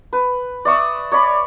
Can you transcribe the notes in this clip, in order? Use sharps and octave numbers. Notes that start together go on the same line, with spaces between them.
B4
D5 E5 C#6 D#6
C#5 D5 B5